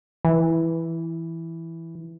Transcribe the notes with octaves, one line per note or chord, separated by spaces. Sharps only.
E3